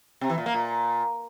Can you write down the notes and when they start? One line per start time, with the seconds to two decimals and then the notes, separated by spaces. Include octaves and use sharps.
0.21 C3
0.30 E3
0.38 A#2
0.46 A#3
0.54 A#2